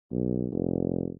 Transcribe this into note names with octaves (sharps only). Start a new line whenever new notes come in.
B1
F1